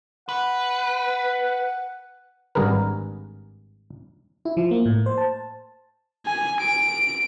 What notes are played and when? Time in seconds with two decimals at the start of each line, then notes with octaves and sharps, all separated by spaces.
0.29 B4 F#5
2.55 G#1 G2 G#4 A#4 B4
4.45 E4
4.57 F3
4.71 A#3
4.85 A2
5.06 C5
5.18 A5
6.26 G#5
6.61 D7